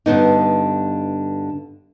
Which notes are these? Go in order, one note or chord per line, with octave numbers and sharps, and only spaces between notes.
G2 D3 B3 D#4